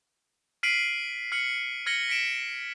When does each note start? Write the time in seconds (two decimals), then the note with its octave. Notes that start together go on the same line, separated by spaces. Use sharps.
0.63 F6 B6 C7 D7 D#7 F#7
1.32 F6 B6 C#7 F#7
1.86 F6 G#6 A#6 C#7 F#7 G7
2.09 B6 C#7 D7 E7